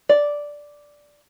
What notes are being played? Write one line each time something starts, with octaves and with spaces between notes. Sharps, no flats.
D5